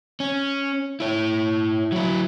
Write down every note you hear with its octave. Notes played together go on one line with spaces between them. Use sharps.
C#4
E4 C#5
F#3 E4